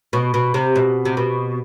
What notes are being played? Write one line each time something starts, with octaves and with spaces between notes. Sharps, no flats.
B2
B2
C3
B2
C3
B2